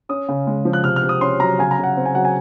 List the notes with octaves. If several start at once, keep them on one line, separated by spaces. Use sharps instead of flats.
C#4 D#6
C#3
G#3
F3
F#6
C3 F6
F6
C3
D#6
C#4 C6
F#3 A#5
C#3 G#5
A#5
C#3
F#5
C4
G#5
F#3 F#5
G#5